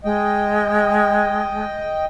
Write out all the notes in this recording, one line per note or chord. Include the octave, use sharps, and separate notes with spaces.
G#3 D#5 G5